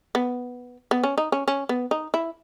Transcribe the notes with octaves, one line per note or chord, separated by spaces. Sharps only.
B3
B3
C#4
D#4
C#4
C#4
B3
D#4
E4